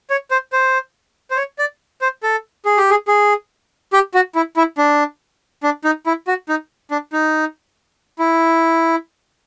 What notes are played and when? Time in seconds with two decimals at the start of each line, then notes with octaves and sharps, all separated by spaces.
0.10 C#5
0.31 C5
0.52 C5
1.31 C5
1.37 C#5
1.59 D5
2.01 C5
2.23 A4
2.65 G#4
2.77 G4
2.90 G#4
3.08 G#4
3.93 G4
4.14 F#4
4.35 E4
4.57 E4
4.78 D4
5.63 D4
5.85 D#4
6.06 E4
6.28 F#4
6.49 D#4
6.91 D4
7.13 D#4
8.19 E4